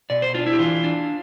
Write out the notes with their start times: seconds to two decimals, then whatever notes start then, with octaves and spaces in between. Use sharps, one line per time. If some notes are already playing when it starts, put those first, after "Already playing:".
0.10 B2 D5
0.22 C5
0.34 D4 F4
0.46 E4
0.53 G4
0.59 E3 F4
0.84 D4